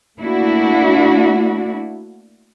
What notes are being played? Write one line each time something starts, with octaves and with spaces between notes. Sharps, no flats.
A3 A#3 D4 E4 F#4